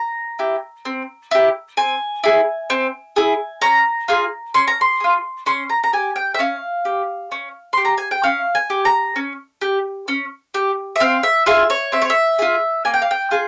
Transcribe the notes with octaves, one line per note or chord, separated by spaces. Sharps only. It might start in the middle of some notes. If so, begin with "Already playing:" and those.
Already playing: A#5
E4 G4
C4
E4 G4
C4 G#5
E4 G#4
C4
E4 G#4
C#4 A#5
F4 G#4
C#4 C6
A#5
C6
F4 G#4
C#4 C6
A#5
A#5
G4 G#5
G5
E5
C#4 F5
G4
C#4
G4 C6
A#5
G#5
G5
C#4 F5
G#5
G4
A#5
C#4
G4
C#4
G4
E5
C4 F5
E5
F4 G#4 E5
C#5
C4 E5
C#5
E5
F4 G#4
A#3 G#5
G5
F5
G5
F4 G#4